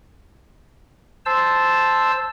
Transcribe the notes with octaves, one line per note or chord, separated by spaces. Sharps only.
C5 A5 E6